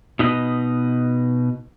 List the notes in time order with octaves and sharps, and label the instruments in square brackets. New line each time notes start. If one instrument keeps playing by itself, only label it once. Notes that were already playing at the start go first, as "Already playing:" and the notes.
[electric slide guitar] B2 D#4 B4 D#5